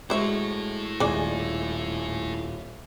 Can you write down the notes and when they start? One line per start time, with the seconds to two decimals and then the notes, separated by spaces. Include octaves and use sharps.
0.10 G#3 E4 F#4 A4 C5 E5 C#6
1.00 D#1 G#3 G#4 D5 G#5